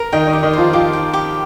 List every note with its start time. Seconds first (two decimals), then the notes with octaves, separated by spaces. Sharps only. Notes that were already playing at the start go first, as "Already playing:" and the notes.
Already playing: A#4
0.12 D#3 D#4 G5
0.28 D#3 D#4
0.33 G4
0.43 D#3 D#4
0.53 F3 F4 C5
0.73 F3 F4 G4
0.93 G5
1.13 G4